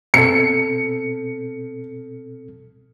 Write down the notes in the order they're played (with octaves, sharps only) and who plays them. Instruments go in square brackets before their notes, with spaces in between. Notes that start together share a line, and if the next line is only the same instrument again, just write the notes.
[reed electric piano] B2 C4 A4 [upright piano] C#7